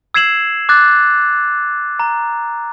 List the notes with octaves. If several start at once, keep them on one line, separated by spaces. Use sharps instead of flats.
E6 G#6 C7 E7 F#7
D6 F#6 A6
A#5